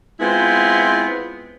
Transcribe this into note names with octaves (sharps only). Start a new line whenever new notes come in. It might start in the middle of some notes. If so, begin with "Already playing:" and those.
G#3 B3 C4 E4 F4